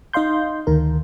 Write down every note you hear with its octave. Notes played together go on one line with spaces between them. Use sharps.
D#4 D#5 F5 C6 G6
D2 D#3 A#4